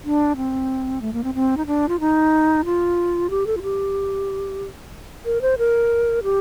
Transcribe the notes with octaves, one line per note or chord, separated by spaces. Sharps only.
D4
C4
A3
A#3
C4
C4
D#4
D4
F4
D#4
F4
G4
A4
F4
G4
A#4
C5
A#4
G4